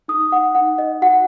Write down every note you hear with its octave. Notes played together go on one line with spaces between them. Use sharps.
D#4 D#6
F#5
D#4 F#5
D#5
F#4 F#5